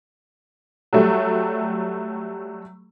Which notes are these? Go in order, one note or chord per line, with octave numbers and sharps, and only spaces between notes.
F#3 G3 A3